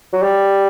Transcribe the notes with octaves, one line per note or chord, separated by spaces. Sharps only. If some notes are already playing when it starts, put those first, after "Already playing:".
F#3
G3